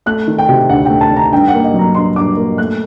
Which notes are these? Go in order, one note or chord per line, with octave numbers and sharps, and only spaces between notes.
A3 F#6
D#3
G5
C3
D2 F#5
A3 G5
A5
D#3
A#5
G2 G5
F#5
A#3
D#5
F#3
A#5
G2 C6
G2 D6
A#3
A3 F#6